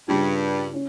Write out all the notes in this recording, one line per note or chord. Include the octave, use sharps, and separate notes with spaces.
G2 C#3 G3 D4 F4
C#4